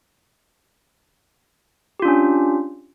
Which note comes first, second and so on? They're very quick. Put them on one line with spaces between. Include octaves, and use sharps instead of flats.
G4 F4 D4 C#4